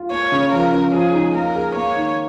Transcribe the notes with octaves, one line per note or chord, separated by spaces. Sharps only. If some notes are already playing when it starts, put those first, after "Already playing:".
Already playing: F4
A#3 C#5
C#3
F3 A#4
C#4
F3 G#4
D#4
A#3 A#4
G#4
A#3 C#5
D#3